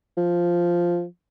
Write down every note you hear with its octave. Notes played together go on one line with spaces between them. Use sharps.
F3